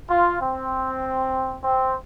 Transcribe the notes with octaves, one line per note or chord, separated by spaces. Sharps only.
F4
C4
C4